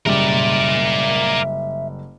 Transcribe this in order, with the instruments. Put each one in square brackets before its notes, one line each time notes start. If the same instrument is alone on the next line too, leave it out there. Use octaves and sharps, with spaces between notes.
[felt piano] F#1 G3 [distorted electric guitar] A#4 D5 [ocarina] E5